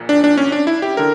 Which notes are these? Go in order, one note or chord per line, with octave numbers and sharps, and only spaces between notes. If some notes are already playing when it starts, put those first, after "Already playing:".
Already playing: A#1 A#2
D4
D4
C#4
D4
E4
G4
D3 A#4